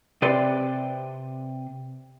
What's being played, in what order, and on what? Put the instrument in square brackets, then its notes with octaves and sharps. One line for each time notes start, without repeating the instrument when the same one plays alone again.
[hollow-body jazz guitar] C3 B4 D5 C6